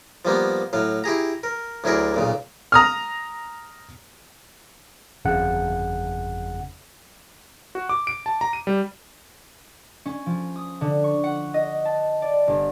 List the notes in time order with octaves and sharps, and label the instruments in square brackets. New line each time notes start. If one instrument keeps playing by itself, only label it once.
[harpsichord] F3 G3 A#3 B3
A2 F#3 F5
E4 G4 G#4 A#5
A#4
D2 F#3 E4 G#4 A#4 D5
B1 A#2 C#3
[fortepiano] A#5 D#6 F6
[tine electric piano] G1 F2 C#3 F3 F#5
[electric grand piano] F#4
D6
D7
A5
A#5
D#7
G3
[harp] C#4
F3
D#6
D3
C#6
F#5
D#5
A5
D5
G1